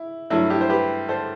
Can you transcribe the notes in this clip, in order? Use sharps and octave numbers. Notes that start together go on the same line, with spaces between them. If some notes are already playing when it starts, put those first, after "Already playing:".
Already playing: E4
G2 F#3 A3 E4
E4 G4
C5
G4 B4
A4 C5